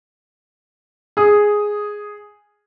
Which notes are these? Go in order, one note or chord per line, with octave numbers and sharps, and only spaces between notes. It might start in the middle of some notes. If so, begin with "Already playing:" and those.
G#4 D#6